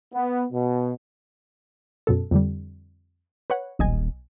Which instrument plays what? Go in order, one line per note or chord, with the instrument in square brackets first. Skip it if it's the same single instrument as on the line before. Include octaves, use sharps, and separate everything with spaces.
[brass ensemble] B3
B2
[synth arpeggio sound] F#2 B2 A4
F2 D3 G3
B4 C#5 F#5
[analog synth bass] D#1 [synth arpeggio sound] B1 D#5 G#5